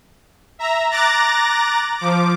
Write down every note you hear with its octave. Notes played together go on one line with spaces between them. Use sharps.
E5 A#5
A#5 D6 F#6 A6 A#6
F3 D6